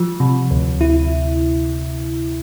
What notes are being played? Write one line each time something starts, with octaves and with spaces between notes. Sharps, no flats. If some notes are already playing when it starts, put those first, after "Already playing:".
Already playing: F3
C3
D2
E4